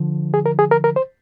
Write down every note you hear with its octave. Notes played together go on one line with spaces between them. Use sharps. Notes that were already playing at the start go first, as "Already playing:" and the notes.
Already playing: D3 F3
G#4
A#4
G#4
A#4
A#4
C5